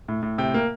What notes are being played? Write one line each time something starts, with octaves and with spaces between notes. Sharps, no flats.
A2
A2
C3 G5
A#3